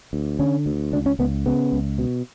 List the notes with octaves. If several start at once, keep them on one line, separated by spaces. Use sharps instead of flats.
D2
D3 C#4
D2
C#2 D4
C#4
C#2 B3
C#3 B3
C#2
B2